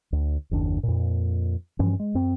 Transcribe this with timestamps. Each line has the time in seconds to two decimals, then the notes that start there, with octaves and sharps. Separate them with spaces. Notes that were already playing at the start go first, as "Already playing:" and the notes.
0.12 D2
0.51 F#1 D#2 D4
0.83 F2 A#2
1.79 G2 E3 F3 C#4
2.00 G#3
2.15 F#2 C4